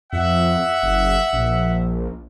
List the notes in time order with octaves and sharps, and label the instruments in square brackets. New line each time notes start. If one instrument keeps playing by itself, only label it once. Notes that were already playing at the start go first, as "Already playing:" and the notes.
[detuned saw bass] F2 [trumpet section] E5 F#5
[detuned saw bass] F#1
A#1